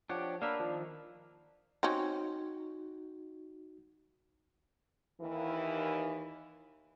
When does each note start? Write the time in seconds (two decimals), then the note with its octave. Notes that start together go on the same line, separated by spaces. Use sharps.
0.09 F3 D4 G4 C#5 F#5
0.42 A#3 D4 A#4 B4 F5 E6
0.60 D#3 F3
1.83 C4 C#4 D#4 F#4
5.21 D#2 E3